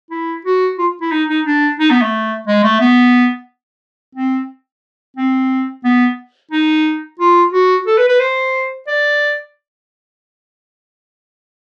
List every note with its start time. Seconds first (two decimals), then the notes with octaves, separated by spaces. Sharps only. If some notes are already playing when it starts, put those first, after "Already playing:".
0.10 E4
0.45 F#4
0.78 F4
1.01 E4
1.12 D#4
1.29 D#4
1.45 D4
1.79 D#4
1.90 B3
2.02 A3
2.47 G#3
2.64 A3
2.81 B3
4.15 C4
5.17 C4
5.84 B3
6.51 D#4
7.19 F4
7.53 F#4
7.87 A4
7.98 B4
8.09 B4
8.20 C5
8.87 D5